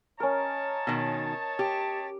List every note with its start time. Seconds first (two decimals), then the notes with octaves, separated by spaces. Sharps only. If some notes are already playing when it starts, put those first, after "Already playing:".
0.20 C#4 A#4 C#5 D#5 A5
0.87 B2 D#3
1.59 G4